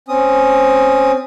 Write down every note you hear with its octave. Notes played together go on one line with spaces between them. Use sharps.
C4 C#4 D#6